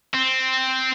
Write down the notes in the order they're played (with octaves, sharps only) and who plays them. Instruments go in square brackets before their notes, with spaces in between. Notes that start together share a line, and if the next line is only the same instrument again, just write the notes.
[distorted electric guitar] C4